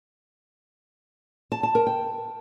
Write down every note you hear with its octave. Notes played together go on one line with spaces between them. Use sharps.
A5
A5
A#4
G5